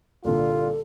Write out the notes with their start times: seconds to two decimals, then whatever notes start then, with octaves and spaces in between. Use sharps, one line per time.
0.24 C2 A#2 D3 F4 A4